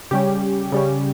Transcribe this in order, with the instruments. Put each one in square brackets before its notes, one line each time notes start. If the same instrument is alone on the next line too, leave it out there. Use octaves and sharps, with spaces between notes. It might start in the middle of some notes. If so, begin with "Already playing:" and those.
[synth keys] C#3 G3 C#4 G4
C#3 G3 C#4